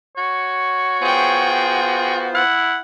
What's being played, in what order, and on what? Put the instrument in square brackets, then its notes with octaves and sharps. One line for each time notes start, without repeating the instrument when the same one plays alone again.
[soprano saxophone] F#4 [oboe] C#5
[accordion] B3 F4 C5 [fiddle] G#4 G5
[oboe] E4 [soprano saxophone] F#5